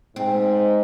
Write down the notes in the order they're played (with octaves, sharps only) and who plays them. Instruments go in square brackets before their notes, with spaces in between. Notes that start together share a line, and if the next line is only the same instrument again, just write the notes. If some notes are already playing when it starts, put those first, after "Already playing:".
[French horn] G#2 [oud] C4